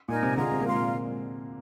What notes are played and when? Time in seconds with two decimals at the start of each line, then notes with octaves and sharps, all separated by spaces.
0.08 A#2 D#4 A#4 D#5 G#5
0.23 C3
0.37 D3 F4 G#4 D#5 A#5
0.52 C3
0.61 A#3
0.66 G#3 F4 A#4 F5 C6
0.75 A#2